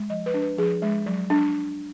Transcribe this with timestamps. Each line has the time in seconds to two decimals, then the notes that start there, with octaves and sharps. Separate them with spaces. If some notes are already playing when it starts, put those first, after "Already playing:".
Already playing: G#3
0.10 F3 D#5
0.26 B4
0.34 D4
0.42 B4
0.58 F3 G#4
0.82 G#3
1.06 F#3
1.30 D4